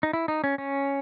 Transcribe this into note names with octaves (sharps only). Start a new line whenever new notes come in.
D#4
E4
D#4
C#4
C#4